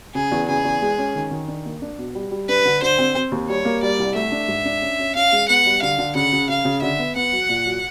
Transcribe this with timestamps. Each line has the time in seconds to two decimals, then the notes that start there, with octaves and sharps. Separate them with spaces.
0.14 C#3 G#4
0.31 E2
0.48 C#3 G#4
0.64 E2
0.82 G#3
0.98 C#4
1.15 D#3
1.31 D#3
1.48 D4
1.65 A#3
1.82 D4
1.98 B2
2.15 G3
2.31 G3
2.48 D4 B4
2.65 D3
2.82 D3 C5
2.98 C4
3.15 C4
3.32 D#2
3.49 G3 C#5
3.65 A#3
3.82 G3 D5
3.99 C2
4.15 A3 E5
4.32 D4
4.48 G#2
4.65 D4
4.82 C#4
4.99 C#4
5.15 C#4 F5
5.32 G#3
5.48 B3 F#5
5.66 G3
5.82 D3 F5
5.99 D3
6.15 C#3 F#5
6.33 C#3
6.48 C#3 F5
6.65 C#3
6.82 D3 E5
6.99 B3
7.16 B3 F#5
7.32 F#3
7.49 A#2
7.66 F#3